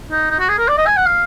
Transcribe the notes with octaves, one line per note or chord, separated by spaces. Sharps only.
D#4
D#4
F#4
G#4
A#4
D5
D#5
G#5
F#5
F5